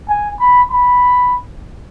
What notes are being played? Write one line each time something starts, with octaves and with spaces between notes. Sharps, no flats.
G#5
B5
B5